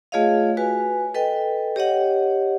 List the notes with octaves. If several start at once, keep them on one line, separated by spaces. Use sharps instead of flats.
A3 F4 G#4 C#5 D#5 F5
F#4 B4 G#5
A4 B4 D#5 G5
G4 C#5 D#5 F#5